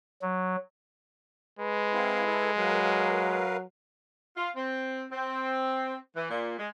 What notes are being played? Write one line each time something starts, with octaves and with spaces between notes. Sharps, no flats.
F#3
G#3 B4
C4 E4 F5
E4 A4
F#3 A#4 B4 F5
F4
C4
C4
E3
A#2
G#3